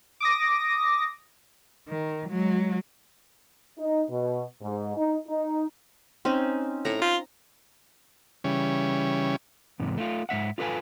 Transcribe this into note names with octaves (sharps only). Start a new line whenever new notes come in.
D6 D#6 A#6
D#3
F#3 G#3
D#4
B2
G#2
D#4
D#4
C4 C#4 D#4
A2 A#5
F4
C#3 E3 G3 C#4
E2 G#2 C3
A3 F4
G#2 C4 E5 F#5
F4 A4 B4 F5 G#5